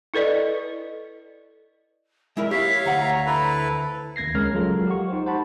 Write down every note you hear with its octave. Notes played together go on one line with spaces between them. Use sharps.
E4 A4 B4 D5 D#5
G#3 E4 A#4 E5
G4 C#5 E5 F5 B6
D2 F#5 A#5
E4 A4 B4
D#2 A#3 G#6 A#6 C7
C#2 G#3 C#4 A#4 C#5 F6
F3 F#3 G#3 F4 A4 A#4
G4 F#5 C#6
D#4 G4 C5
C5 F#5 A5 B5